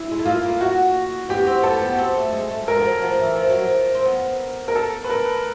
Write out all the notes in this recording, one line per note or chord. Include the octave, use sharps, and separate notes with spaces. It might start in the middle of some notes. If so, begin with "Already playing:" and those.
Already playing: E4
G#3
A3
A#3 F4
A#3
F#4
B3 G4
C4
B3 A4
B3
C4
A3
G#3
A3
G#3 A#4
F3
F#3
F3
E3
F3
F#3
F3
C4
B3
A#4
A4
B4
A#4